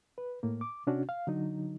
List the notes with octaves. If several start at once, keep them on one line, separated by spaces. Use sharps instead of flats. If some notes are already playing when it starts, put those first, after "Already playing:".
B4
A2 A#3
D6
C3 C#4 D4 F#4
F5
D3 F#3 D#4